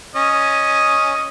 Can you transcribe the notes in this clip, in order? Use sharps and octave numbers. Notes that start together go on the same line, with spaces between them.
C#4 D#5